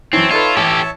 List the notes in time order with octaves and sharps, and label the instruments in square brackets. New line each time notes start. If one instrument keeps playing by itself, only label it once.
[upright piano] F#2 E3 [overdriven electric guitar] C4 [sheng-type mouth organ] C#5 E5 A5
[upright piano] D#4 A4 B4 [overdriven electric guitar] F4
[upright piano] A1 [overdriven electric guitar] G4 A4